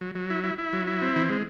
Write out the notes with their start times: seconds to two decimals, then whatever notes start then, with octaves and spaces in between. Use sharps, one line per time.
0.01 F#3
0.15 F#3
0.30 E4
0.44 E4
0.58 E4
0.73 F#3
0.87 E4
1.02 C4
1.16 E3
1.30 G#3